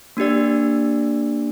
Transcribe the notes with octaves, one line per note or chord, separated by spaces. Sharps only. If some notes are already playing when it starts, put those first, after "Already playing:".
A#3 D4 G4 D5